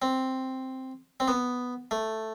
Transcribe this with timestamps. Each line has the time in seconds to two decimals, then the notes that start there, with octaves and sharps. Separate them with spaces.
0.02 C4
1.20 C4
1.28 B3
1.91 A3